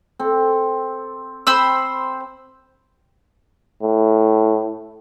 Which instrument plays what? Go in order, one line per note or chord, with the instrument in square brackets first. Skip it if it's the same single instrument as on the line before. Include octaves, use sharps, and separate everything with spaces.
[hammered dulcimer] C4 A4
[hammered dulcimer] C4 [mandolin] C5 B5 E6
[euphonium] A2